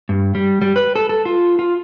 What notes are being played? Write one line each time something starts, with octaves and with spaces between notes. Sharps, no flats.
G2
G3
G3
B4
A4
A4
F4
F4